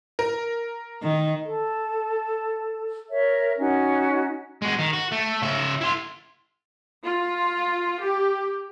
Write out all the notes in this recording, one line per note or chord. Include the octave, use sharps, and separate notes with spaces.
A#4
D#3
A4
A#4 C#5 E5
C#4 D#4 F#4
G#3 F#4
D#3
F#4
A3
C#3 E5
E4 C6
F4
G4